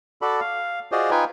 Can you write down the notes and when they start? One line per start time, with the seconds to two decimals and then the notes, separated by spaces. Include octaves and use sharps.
0.22 F#4 A4 D5 B5
0.40 F5
0.92 F4 F#4 G#4 C5 D5 D#5
1.11 D#4 F4 B4 G5 G#5